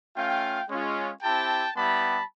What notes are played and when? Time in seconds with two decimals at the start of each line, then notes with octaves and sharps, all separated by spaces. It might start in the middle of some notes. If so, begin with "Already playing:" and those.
0.16 A3 C#4 F4 F5 G5
0.69 G#3 C#4 F4
1.22 C4 E4 G4 G5 A5
1.75 G3 B3 E4 G4 A5 B5